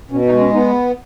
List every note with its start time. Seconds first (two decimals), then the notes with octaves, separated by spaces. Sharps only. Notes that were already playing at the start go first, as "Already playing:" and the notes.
0.11 B2 C#4
0.25 D#4
0.32 G#3
0.40 C#4
0.53 B3 D#4